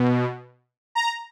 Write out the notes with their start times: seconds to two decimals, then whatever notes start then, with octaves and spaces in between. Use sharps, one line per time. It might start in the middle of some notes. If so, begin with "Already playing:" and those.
Already playing: B2
0.95 A#5